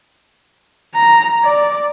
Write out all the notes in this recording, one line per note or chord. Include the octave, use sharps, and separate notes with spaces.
A#5
D5